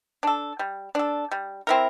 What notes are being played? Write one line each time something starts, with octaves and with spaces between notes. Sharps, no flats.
D4 A4
G3
D4 A4
G3
C4 E4 A#4